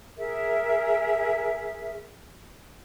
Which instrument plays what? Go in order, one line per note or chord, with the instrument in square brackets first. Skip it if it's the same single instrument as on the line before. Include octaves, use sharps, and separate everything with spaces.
[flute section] G#4 A#4 E5